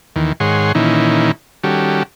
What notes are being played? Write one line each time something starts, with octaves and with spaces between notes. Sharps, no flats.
D#2 D#3 E3
G#2 D#3 G#4 C#5 F#5 C6
A#2 D#3 E3 C#4 D#4 E4
D#3 G3 C#4 F#4 G4 A4